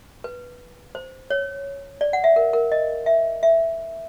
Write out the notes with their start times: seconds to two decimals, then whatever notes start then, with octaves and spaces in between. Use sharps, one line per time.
0.24 B4
0.95 C5
1.30 C#5
2.01 D5
2.13 F#5
2.24 E5
2.36 A#4
2.53 A#4
2.72 D#5
3.06 E5
3.43 E5